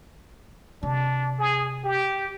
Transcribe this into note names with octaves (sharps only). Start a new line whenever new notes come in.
C3 D4
G#4
G4